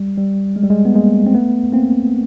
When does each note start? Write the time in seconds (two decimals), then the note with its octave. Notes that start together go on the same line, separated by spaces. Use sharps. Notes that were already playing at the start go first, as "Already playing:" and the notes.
Already playing: G3
0.18 G3
0.56 G#3
0.64 G3
0.70 G#3
0.85 B3
0.95 G#3 A#3
1.27 C4
1.34 A3 B3
1.73 A#3 C4